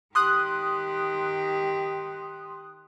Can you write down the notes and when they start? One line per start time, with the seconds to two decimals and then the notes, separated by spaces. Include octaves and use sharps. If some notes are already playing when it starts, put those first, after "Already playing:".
0.15 D#3 G4 C6 D#6 F#6